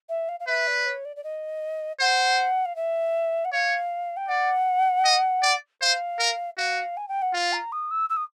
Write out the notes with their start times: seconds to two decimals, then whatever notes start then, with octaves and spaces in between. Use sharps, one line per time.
0.09 E5
0.29 F5
0.40 F5
0.47 B4 E5
0.67 D5
0.86 C#5
1.05 D5
1.16 D5
1.24 D#5
2.00 C5 F#5
2.65 F5
2.76 E5
3.45 F#5
3.52 C#5 F5
4.17 G5
4.28 D5 F#5
5.05 D#5
5.43 D5
5.81 C5 F5
6.19 A#4
6.57 F#4 F5
6.97 G#5
7.08 G5
7.22 F#5
7.34 F4 F5
7.53 A#5
7.72 D#6
7.91 E6
8.09 E6
8.17 D#6